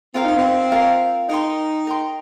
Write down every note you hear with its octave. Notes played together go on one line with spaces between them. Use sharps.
C4 F4 A#4 F5
D#4
C4
F4 A#4 F5
D#4 A#4 G5 C6
A#4 G5 C6